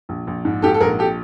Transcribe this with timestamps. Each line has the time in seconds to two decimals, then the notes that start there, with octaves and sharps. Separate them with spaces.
0.09 A#1
0.27 A#1
0.45 G#2
0.62 G#2 G4 A4
0.74 A4
0.81 A#1 G#4 A#4
0.99 G4 A4